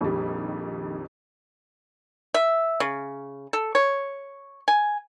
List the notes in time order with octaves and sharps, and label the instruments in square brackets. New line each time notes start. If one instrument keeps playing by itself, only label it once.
[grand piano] A#1 [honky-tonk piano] F2 D#3 G3
[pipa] E5
C#3
A4
C#5
G#5